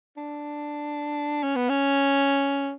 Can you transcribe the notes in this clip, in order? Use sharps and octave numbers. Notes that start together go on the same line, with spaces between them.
D4
C#4
B3
C#4